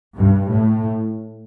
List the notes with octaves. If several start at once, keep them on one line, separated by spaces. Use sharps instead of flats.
G2
A2